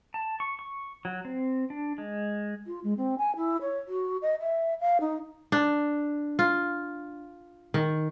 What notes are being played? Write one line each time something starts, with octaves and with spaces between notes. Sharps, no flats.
A5
C#6
C#6
F#3
C4
D4
G#3
F4
G#3
C4
G#5
E4
C#5
F#4
D#5
E5
F5
D#4
D4
F4
D#3